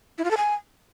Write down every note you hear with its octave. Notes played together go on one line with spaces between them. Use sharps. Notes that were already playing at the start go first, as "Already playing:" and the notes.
E4
F4
A4
G#5